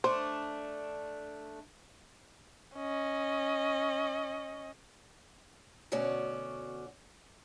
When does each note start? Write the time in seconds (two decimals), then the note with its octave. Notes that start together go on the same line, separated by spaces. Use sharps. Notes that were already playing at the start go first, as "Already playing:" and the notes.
0.04 A3 D4 C5
2.77 C#4 D#5
5.92 D2 B2 C#4 F#4 D5